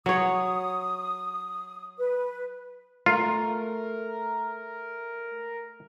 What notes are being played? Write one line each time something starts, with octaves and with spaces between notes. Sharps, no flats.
F#3 C#5 D#6
B4
A3 F4 A#4